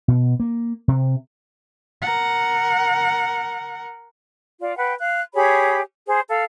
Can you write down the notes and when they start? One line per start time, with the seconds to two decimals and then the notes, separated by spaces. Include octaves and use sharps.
0.08 B2
0.40 A#3
0.88 C3
2.02 A#4 F#5
4.61 F4 D5
4.77 B4 F#5 G5
4.99 F5 F#6
5.34 G4 G#4 C#5 B5
6.07 G#4 C5
6.29 A4 F5